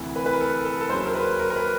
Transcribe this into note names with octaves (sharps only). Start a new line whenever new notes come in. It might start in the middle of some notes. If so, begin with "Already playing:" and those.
Already playing: D2 C3 E3
B4
B4
A#4
A4
A4
A4
D#2 C#3 F#3 A#3 C#4 C5
A#4
B4
A#4
A#4
B4